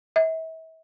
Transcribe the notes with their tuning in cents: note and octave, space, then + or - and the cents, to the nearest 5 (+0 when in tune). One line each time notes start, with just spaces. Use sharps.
E5 -40